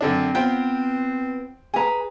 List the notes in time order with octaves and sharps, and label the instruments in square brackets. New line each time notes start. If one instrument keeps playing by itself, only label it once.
[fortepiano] F#2 D3 D4 [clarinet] C4
[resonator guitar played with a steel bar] B3 F4 B4 [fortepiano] C5 G5
[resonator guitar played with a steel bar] G#4 B4 [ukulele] G#5 A#5